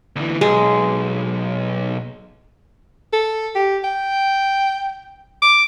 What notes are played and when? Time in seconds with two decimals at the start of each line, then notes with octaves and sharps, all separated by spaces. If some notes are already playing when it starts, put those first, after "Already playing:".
0.16 D2 E3
0.41 B1 G#3
3.13 A4
3.55 G4
3.84 G5
5.42 D6